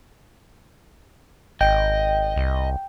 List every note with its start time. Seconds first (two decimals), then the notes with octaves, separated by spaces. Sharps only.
1.61 G#1 D#5 G5
2.36 C2